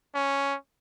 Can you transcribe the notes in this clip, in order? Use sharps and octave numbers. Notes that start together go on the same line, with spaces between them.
C#4